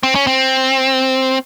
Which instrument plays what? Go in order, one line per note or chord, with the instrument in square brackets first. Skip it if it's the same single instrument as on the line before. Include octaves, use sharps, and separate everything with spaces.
[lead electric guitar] C4
C#4
C4